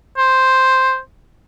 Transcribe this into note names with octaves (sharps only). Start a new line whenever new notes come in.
C5